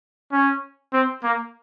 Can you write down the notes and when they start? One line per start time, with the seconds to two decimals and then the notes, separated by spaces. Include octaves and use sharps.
0.32 C#4
0.93 C4
1.23 A#3